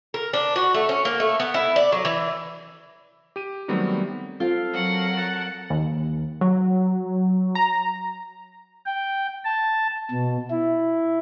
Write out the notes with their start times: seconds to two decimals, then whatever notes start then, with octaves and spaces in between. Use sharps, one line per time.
0.14 A#4
0.33 D4
0.56 F#4
0.74 A3
0.89 C#4
1.05 A#3
1.20 A3
1.40 B3
1.54 E4
1.76 D5
1.92 F#3
2.05 E3
3.36 G4 D#7
3.68 D#3 F#3 G3 A3 B3 C4
4.40 C4 F4 A4 F5
4.73 F#3 A#4 F#5
5.17 A5 F#6
5.70 D#2
6.41 F#3
7.55 A#5
8.86 G5
9.44 A5
10.11 B2
10.50 E4